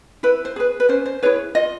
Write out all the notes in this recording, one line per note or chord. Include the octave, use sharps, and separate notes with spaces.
E4 B4
C5
G#4 B4
B4
C#4 C5
C5
E4 G#4 B4 C#5
F4 D#5